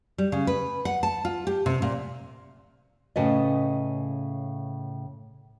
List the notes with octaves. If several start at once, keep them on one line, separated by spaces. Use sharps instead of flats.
G3
C#3
B4
F#5
A5
F4
G4
C3
A#2
A2 C#3 G#4 A4 B4 D#5